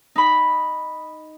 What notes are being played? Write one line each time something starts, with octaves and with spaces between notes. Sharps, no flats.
D#4 B5